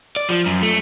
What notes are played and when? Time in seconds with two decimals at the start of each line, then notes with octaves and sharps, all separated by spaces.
0.16 D5
0.29 F3
0.46 F#2
0.63 A3